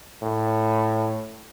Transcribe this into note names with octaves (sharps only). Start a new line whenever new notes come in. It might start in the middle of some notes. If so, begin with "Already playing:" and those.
A2